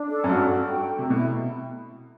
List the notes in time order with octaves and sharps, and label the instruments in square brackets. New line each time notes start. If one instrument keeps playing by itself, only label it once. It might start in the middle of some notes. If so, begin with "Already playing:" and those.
Already playing: [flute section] D4
A4
[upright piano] F#2
[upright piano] G2 [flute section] F#4
[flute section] F#4
G5
A4
[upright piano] C3
[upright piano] B2 [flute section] E4